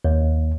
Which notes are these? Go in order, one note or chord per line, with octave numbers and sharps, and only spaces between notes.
D#2